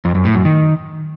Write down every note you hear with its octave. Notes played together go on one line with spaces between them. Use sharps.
F2
F#2
A2
F#2
D#3